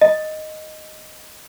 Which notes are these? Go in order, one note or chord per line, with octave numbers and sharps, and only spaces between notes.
D#5